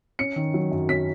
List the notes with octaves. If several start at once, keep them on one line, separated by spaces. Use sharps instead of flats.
C#4 C#7
D#3
F#3
F#2
C#4 B6